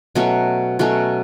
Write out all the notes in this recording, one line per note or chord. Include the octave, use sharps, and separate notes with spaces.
B2 F#3 A3 C#4 F#4
B2 F#3 A3 C#4 F#4